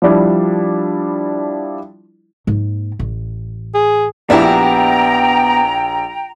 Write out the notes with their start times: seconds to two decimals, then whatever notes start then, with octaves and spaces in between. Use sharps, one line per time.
0.02 F3 G3 D4 E4
2.47 G#2 A#3
2.99 A1
3.74 G#4
4.30 A#1 B3 D4 E4 G4 E5 G5 A#5